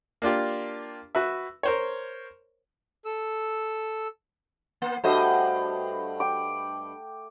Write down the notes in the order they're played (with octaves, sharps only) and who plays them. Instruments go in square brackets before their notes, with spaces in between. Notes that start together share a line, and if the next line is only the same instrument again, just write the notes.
[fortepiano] A#3 D4 F4 G4
F#4 B4 E5
A#4 C5 C#5
[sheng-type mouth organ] A4 E6
[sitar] A#3
[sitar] G2 C5 D#5 [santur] A3 F#4
[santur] G5 D6